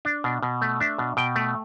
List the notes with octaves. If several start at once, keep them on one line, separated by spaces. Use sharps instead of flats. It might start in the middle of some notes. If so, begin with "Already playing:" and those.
D4
B2
B2
A3
D4 E5
B2
B2 G5
A3